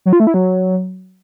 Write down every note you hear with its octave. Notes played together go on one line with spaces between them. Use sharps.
F#3
F4
A3
E4
F#3